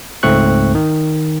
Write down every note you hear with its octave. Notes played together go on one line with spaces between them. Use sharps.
C#2 G#2 A3 C4 C#6 F#6
D#3